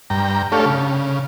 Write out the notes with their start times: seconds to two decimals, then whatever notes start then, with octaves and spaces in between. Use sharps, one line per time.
0.10 G2 G5 A#5
0.52 A3 D4 G4 A4 C#5 F5
0.66 C#3